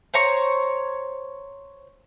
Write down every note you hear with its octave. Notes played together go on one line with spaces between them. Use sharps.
C5 C#5 A#5 C#6